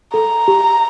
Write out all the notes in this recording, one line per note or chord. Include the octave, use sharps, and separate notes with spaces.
A4 A#5
G4